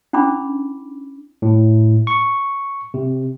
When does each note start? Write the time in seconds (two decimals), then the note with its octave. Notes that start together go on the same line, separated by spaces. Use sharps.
0.13 C#4 D4 E4 B5 D6
1.42 A2
2.07 C#6
2.94 C3